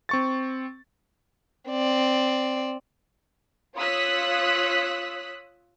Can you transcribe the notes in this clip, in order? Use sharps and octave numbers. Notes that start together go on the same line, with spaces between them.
C4 C#6 A6
C4 D5
F4 C#5 D#6 E6 F#6 B6